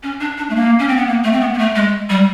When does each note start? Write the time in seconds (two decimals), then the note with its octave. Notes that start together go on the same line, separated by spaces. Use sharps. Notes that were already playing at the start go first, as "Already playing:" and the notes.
0.03 C#4
0.21 D4
0.38 D4
0.50 A3
0.55 A#3
0.79 C#4
0.88 C4
0.97 B3
1.07 A#3
1.24 A3
1.33 C4
1.41 B3
1.54 A#3
1.58 A3
1.75 G#3
2.10 G3